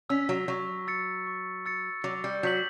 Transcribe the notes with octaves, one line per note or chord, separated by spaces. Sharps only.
C#4 E6 B6
F#3
F#3 C#6
E6 A6 C#7
C#6
E6 A6 C#7
F#3 D6
G3
F#3 G6 B6 F#7